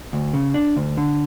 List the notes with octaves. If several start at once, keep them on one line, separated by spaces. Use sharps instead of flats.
D2
C#3
D4
D2
D3